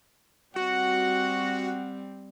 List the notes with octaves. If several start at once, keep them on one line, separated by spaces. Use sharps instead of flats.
G3 C4 F#4 F#5